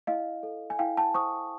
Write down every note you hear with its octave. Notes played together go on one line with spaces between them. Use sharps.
E4 D#5 F5
A4
G#5
E4 F5 G5
G5 A5
C5 C#6 D#6